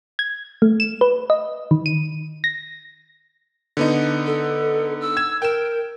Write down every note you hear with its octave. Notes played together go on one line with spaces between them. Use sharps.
G#6
A3
E7
B4
D#5
D#3
D#7
A#6
D3 B3 D#4
A4
E6
G#6 E7
A#4 G5 E7